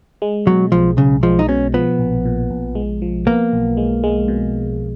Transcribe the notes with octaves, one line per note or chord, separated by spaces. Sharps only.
G#3
B2 F#3
B1 F3
B1 C#3
F3 G#3
D#4
B2 C#4
F3 B3
A#1
A#2
A#1
G#3
F3
A#3 B3
B1
G#3
G#3
B2